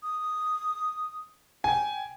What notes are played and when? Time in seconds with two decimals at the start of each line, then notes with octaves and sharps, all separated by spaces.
0.03 D#6
1.64 G5 G#5